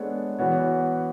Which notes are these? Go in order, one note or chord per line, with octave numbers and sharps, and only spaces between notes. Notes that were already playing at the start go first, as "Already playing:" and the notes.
Already playing: G#3 B3 D4 A4 C#5
E3 B3 F#4 C#5